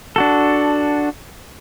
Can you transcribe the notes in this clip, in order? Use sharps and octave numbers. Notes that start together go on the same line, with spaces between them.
D4 F#4 A4